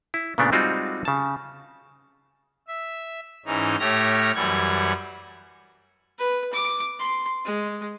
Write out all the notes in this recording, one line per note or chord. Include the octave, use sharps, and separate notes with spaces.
E4
A#2 C#3 A3 B3 C4 D4
G3 G#3 C4 D#4 F4 F#4
C#3 A5
E5
G#2 E3 C#4 D#4
A2 A3 G4 C#5 F6 A#6
F#2 E3 G3 F#5 G#6
B4
D6
C6
G#3